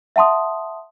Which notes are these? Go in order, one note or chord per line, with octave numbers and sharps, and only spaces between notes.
E5 F#5 A5 C6 D#6